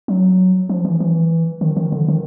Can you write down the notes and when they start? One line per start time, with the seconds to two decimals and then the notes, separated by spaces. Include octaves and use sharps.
0.08 F#3
0.69 F3
0.85 E3
1.00 E3
1.61 D#3
1.77 D#3
1.92 D3
2.08 D#3